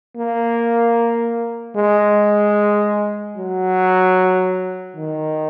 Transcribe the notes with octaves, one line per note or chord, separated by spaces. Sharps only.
A#3
G#3
F#3
D#3